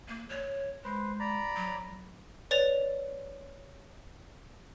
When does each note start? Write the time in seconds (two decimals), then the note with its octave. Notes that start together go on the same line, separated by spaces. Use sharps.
0.08 A#3
0.29 C#5
0.84 G#3 B4 C5
1.20 D5 A#5 B5
1.56 F#3
2.51 B4 C#5 D5 A6 F7